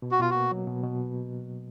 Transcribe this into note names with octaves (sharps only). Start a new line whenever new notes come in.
B2
F#4
B2 F4
A#3 F#4
F#3
B2
B2